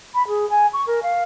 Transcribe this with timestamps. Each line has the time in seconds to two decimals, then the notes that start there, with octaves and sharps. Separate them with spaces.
0.14 B5
0.27 G#4
0.49 G#5
0.73 C#6
0.86 A#4
1.02 F5